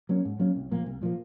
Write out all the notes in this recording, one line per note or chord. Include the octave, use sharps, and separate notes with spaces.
F#3 A#3 C#4
G#2
F#3 A#3 C#4
C2
A#2 F3 A#3
C2
A#2 F3 A#3